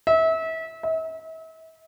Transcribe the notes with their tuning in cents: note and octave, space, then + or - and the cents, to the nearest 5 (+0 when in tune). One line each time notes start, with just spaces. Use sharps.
E5 -30
E5 -40